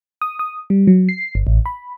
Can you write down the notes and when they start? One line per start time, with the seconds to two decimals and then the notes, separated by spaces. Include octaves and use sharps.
0.22 D#6
0.39 D#6
0.70 G3
0.87 F#3
1.09 C7
1.35 G1
1.47 A1
1.66 B5